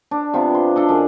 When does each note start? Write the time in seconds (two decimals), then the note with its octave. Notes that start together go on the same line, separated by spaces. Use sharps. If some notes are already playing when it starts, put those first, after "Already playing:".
0.11 D4
0.34 C3 B3 F4
0.55 C6
0.76 D4 A4 D#5
0.89 F#2 G#4